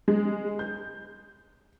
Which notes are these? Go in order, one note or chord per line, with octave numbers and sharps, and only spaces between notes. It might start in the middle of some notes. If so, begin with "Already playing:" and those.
G#3
G6